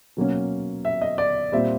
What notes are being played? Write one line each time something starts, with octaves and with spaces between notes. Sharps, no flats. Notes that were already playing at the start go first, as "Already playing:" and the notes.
B2 F#3 A#3 C#4
E5
D#5
D5
A#2 G3 C4 E5